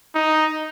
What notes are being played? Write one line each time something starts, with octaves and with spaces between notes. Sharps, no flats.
D#4